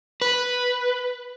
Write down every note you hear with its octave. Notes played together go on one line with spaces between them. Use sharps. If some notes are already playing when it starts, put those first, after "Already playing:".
B4